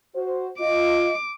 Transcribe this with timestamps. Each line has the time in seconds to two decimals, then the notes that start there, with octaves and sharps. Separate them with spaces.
0.16 F#4 C5
0.60 F4 D#5 D6